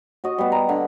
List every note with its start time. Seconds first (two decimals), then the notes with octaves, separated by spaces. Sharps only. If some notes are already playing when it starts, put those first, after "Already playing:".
0.24 F#4 D#5
0.38 G3 B3
0.52 A#5
0.69 D3